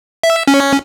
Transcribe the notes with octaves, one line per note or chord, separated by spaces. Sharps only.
E5
C#4